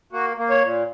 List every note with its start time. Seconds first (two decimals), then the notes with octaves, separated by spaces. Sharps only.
0.12 A#3 F#4
0.37 A#3
0.50 C#5
0.63 A#2